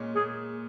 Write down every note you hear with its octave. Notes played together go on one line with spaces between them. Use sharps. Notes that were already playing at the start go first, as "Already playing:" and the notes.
Already playing: A#2 G#3 C#4
A#2 G#4